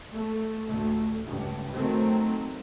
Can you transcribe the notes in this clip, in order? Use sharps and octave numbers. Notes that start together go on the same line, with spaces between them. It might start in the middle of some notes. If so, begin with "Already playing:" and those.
A3
A1 D2 A3
C#2 G2
D#3 F#3 A3 C4